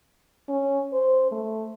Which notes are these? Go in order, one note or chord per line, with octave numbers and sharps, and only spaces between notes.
C#4
C5
A3